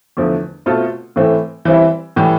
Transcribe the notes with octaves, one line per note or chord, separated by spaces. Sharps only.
E2 D3 F3 A3
B2 A3 C4 F4 A4
A2 E3 A3 C4
E3 G3 C4 E4
A2 E3 G3